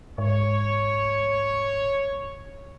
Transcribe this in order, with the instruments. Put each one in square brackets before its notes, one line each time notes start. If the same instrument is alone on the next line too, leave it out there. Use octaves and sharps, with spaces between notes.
[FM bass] G#2 [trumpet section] C#5